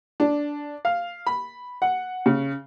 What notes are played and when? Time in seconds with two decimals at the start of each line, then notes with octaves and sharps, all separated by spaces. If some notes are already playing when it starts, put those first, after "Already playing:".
0.20 D4
0.85 F5
1.27 B5
1.82 F#5
2.26 C#3